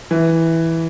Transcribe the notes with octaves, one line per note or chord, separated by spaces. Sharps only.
E3